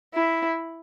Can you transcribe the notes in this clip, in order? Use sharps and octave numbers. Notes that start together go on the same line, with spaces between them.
E4